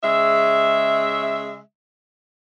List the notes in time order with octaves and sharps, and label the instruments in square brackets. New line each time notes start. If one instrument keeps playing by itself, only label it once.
[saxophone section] C#3 G#3 E5